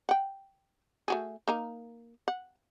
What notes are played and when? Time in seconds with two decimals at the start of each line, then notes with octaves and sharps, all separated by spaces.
0.09 F#5 G5
1.08 A3 F#4 G#4
1.48 A#3 D#4 A#4
2.28 F#5